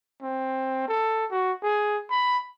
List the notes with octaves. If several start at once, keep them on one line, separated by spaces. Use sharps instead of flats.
C4
A4
F#4
G#4
B5